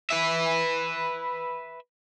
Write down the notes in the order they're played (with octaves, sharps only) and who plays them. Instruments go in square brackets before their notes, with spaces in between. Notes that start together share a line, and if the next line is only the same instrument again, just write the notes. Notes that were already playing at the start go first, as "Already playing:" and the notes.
[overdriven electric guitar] B4 E5